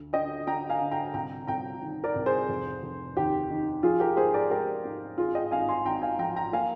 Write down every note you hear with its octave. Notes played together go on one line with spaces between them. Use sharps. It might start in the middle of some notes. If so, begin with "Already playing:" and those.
Already playing: D2
D3 D#5 G5
D3 G5 A#5
F5 G#5
D3
G5 A#5
C2 G5 A#5
C2 G5 A#5
D#3
A#4 D5
C2
G#4 C5
F1
F1
D#2 G4
D#3
F3 F4 G#4
G4 A#4
G#2 G#4 C5
A#4 D5
G#3 G4 A#4
G#2
G#1 F4 G#4
D#5 G5
G#1 F5 G#5
G#5 C6
G#1 G5 A#5
F5 G#5
F3 G5 A#5
G5 A#5
A#3 F5 G#5